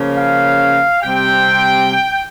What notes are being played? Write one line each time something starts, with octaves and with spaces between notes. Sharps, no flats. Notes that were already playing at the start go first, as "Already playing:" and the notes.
Already playing: C#3 F3 A#3 C#4
F5
C3 G3 C4 G5